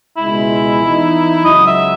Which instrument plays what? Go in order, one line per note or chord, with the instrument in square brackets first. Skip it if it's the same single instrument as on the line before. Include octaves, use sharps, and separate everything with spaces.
[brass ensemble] C#2 B2 G#3 [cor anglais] E4
[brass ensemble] E3 B3 D#4
[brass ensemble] C#2 C#3 F#3 [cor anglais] D#5
[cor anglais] E5